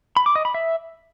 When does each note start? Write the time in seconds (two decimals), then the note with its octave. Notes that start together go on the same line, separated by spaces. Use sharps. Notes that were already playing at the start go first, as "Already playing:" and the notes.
0.17 B5
0.26 D6
0.35 D#5
0.45 B5
0.54 E5